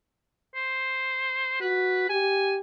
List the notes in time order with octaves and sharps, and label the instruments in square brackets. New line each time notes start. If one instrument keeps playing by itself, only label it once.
[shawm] C5
[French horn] F#4 [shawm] B4
[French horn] G4 [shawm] G#5